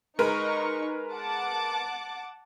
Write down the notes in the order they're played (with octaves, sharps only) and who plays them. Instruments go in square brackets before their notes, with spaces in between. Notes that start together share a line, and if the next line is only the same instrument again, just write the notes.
[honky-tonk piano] G#3 A#4 B4 [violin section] D#4 C#6
[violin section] F#5 A5 D6